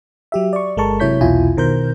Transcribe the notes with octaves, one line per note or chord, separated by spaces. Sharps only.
F#3 G4 E5
D5 C#6
G1 G#3 A4 A#4 A5 C#6
C3 F#3 E4 C#5 G6 B6
B1 E2 B2 E4 F4 G#5
B2 D#3 A#4 C5 A#5 G6